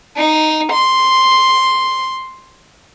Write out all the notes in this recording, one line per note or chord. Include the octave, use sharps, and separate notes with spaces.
D#4
C6